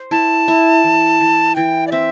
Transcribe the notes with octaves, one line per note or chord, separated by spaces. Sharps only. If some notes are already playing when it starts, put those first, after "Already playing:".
Already playing: C5
E4 A5
E4
E3
E3
E3 G5
D5
C4 E5